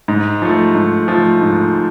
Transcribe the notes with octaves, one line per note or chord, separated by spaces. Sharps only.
G#2
F3 A3
G#2
F3 A3
G#2